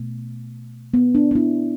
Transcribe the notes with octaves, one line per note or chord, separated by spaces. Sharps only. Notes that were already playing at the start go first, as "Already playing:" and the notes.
Already playing: B2 A3
B3
D4
D4
B3 E4